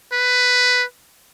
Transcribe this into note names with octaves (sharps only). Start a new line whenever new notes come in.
B4